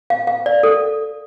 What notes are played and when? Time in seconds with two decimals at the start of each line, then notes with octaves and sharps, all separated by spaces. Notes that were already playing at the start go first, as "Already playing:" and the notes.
0.10 F5
0.27 F5
0.46 D5
0.63 A4